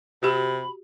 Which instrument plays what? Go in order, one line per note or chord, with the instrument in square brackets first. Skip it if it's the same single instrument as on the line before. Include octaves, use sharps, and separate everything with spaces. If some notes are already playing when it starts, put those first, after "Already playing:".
[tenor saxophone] C3 [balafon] F#4 G4 [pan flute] B5